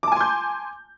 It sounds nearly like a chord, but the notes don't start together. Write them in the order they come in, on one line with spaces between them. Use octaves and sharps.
D6 A5 G#5 C6 G6